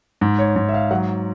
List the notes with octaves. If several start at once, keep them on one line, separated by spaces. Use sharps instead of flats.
G#2
C#5
G#2
E5
F5
F#3 F#5